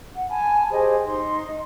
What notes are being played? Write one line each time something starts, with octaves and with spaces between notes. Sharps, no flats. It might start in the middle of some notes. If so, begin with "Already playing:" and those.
F#5
G#5 A5 B5
G4 G#4 C5 D#5
D#4 C6
D#5